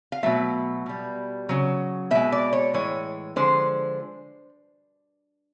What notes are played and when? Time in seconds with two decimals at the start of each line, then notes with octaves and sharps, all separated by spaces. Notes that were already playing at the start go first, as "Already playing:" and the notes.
0.12 F5
0.23 B2 F#3 A3 E5
0.86 B2 G3
1.49 C#3 F#3
2.11 B2 G#3 E5
2.32 D5
2.53 C#5
2.73 A2 E3 G#3 C#5
3.36 D3 F3 G#3 C5